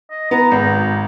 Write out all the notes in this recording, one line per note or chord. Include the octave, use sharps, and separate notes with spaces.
D#5
B3 A#5
G#1 D#4